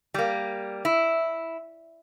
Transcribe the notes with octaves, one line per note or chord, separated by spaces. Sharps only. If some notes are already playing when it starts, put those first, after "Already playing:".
G3 A#3
E4